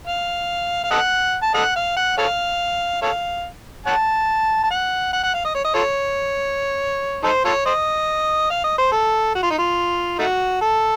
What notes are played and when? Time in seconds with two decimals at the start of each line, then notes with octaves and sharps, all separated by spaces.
0.07 F5
0.84 F5
0.91 A4 D#5 F#5
1.43 A5
1.54 A4 D#5 F#5
1.76 F5
1.97 F#5
2.18 A4 C#5 F5
3.02 A4 C#5 F5
3.86 C#5 F#5 A5
4.63 A5
4.71 F#5
5.13 F#5
5.24 F#5
5.34 F5
5.45 D#5
5.55 C#5
5.65 D#5
5.74 F4 A4 C#5
7.24 D#4 A4 C5
7.45 F4 A4 C#5
7.66 C5 D#5
8.50 F5
8.64 D#5
8.78 C5
8.92 A4
9.35 F#4
9.43 F4
9.51 D#4
9.58 F4
10.19 A3 D#4 F#4
10.61 A4